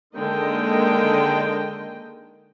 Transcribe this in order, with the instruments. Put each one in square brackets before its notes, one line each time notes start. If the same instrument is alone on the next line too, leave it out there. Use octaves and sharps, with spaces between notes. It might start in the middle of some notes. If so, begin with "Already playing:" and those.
[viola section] D3 D#3 G#3 A#3 D#5 G5